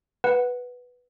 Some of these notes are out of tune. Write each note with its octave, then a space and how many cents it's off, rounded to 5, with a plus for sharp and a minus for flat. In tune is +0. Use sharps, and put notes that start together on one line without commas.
B4 +0 F#5 +0